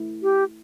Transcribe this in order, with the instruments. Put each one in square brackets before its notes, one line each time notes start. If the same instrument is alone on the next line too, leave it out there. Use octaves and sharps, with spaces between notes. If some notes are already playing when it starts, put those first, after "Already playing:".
Already playing: [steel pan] A3 E4
[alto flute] G4